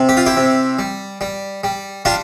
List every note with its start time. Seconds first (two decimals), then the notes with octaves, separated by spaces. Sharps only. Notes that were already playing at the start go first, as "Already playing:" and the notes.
Already playing: C3
0.09 G4
0.17 F4
0.26 E4 G4
0.37 C3
0.79 G3
1.21 G3
1.64 G3
2.05 G3 D4 F4